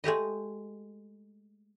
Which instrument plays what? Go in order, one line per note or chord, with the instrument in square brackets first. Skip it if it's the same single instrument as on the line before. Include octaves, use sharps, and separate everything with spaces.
[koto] G#3 A3 G4 D#5